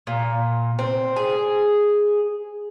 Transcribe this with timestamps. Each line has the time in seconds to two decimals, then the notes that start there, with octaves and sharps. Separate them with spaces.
0.07 A#2
0.79 C4
1.16 G#4